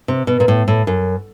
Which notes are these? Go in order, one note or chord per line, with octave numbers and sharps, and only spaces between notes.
C3
B2
A#2
A2
A2
F#2